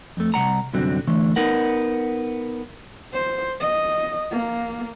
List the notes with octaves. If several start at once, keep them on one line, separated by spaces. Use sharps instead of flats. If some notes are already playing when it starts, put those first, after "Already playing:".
F2 A3
C2 F#5 A#5
C2 F#2 D3 C4 F#4
D3 E3 A3
B3 D#4 A#4 F#5
C5
D#5
A#3